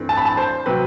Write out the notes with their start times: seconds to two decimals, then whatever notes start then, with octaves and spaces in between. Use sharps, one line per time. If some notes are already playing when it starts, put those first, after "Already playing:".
Already playing: G2 E3 A3 C4
0.09 A5
0.17 B5
0.25 A5
0.37 C5
0.66 C3 F#3 C4 B4